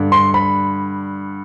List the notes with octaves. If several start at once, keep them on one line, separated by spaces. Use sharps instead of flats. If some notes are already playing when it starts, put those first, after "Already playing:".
Already playing: G2 D3
C6
B5